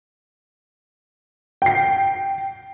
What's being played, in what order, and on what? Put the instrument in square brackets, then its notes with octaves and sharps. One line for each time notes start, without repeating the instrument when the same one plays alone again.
[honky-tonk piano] G5 C7